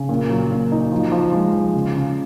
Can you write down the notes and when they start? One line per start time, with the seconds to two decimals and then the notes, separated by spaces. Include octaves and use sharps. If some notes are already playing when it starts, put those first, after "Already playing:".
Already playing: C#3
0.09 A#2
0.29 F#3
0.51 A#2
0.72 D#4
0.92 F3
1.12 F3
1.32 G#3
1.53 F3
1.74 C#3
1.95 C#3